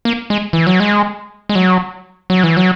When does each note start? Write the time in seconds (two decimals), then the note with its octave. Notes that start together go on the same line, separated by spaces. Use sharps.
0.05 A#3
0.30 G#3
0.53 E3
0.67 F#3
0.80 G#3
1.49 G#3
1.55 F#3
2.30 F#3
2.43 E3
2.57 F#3